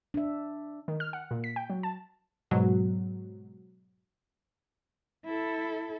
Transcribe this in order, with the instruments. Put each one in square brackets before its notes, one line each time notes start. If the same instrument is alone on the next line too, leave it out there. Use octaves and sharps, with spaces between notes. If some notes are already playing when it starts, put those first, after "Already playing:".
[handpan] D4 E5
[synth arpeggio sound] D#3
F6
F#5
A#2
B6
G5
F#3
A5
[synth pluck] G#2 B2 F#3
[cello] E4 A4